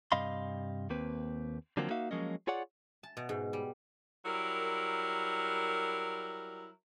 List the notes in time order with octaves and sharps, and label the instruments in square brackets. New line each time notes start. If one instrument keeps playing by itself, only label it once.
[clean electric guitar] G2 C3 D#5 F5 B5 C6
D#2 A#3 C4 B4
D3 F3 F#3 A#3 C4
A#3 D#4 F#4 E5 F5
F3 F#3 G#3 A#3 C#4 D#5
F4 G#4 C#5 D5 F#5
[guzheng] A5
B2
G#2
G3
[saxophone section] F#3 G3 E4 A#4